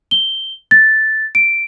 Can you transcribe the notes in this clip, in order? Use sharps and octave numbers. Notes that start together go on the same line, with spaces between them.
G7
A6
D7